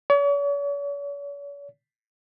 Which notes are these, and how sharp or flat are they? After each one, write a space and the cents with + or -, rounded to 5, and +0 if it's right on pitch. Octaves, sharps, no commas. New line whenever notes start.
C#5 +45